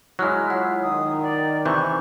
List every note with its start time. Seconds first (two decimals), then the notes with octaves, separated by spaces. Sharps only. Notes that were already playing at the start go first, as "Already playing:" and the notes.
0.19 F#3 G#3 E4 F6 F#6
0.50 F4 C#5 F#5
0.83 D#3 D#6
1.22 D5
1.65 C3 E3 C#6 G6